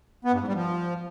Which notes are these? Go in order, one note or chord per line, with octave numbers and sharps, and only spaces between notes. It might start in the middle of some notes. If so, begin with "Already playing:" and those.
B3
G2
G#2
G3
F3